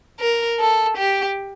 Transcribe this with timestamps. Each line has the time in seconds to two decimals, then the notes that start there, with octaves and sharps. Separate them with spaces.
0.20 A#4
0.59 A4
0.97 G4